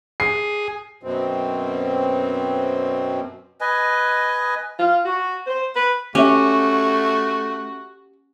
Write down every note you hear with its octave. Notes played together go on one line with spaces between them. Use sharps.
G#4 C7
F#2 B2 C4
B4 D#5 G#5
F4
F#4
C5
B4
A3 C#4 F#4 G4 E5